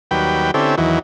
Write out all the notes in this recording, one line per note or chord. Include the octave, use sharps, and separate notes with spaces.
D#2 F#3 G3 B4 G5
D3 C4 C#4 E4 G4 A4
E2 D#3 E3 F#3